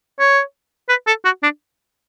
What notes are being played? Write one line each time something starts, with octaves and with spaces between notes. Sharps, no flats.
C#5
B4
A4
F#4
D4